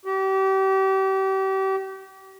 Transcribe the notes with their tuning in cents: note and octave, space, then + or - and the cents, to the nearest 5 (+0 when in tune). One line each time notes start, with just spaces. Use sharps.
G4 -35